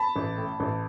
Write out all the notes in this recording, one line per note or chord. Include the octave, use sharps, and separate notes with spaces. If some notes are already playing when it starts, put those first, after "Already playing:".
Already playing: A5 B5
A1
A2
A1